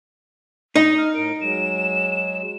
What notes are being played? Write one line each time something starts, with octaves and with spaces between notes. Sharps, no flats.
D#4
D#5 F6
A2 A#4 D7
F#3 G#3 E7